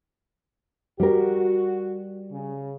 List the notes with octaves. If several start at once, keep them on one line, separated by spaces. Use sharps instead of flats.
G3 F#4 A#4
C#3